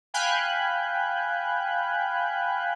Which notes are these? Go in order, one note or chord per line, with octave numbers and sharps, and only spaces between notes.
F5 G5 G#5 B5 F#6 G6